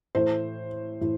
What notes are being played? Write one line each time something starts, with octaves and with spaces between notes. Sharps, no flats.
A2 E3 A3 C5
A2 E3